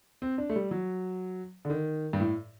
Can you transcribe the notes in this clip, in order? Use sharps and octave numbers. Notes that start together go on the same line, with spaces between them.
C4
D4
A3
G3
F#3
D3
D#3
G2
A2